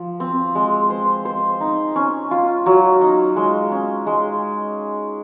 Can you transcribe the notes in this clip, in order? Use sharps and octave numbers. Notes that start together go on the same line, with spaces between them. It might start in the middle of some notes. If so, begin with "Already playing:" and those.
Already playing: F3
C4
G#3
C5
C5
D#4
C#4
F4
F#3
D#4
G#3
C#4
G#3